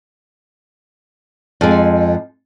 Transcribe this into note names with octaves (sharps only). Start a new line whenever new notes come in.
F2 G#3